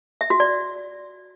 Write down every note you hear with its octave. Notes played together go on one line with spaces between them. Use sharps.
E5
F#4
D5